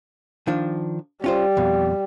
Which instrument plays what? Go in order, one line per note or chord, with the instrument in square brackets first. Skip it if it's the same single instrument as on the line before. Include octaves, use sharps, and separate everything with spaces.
[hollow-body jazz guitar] D#3 F3 D4
[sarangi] G3 [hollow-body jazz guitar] C#4 F4 C5
[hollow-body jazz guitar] F2 B2